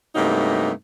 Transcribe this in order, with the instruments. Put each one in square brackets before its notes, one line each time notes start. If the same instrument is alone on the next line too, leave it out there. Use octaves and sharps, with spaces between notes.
[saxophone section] G2 C3 F#3 A3 A#3 D#4